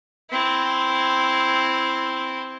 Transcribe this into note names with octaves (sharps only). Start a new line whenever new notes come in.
C4 E4